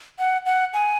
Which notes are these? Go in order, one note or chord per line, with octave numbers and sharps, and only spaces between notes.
F#5
F#5
G#5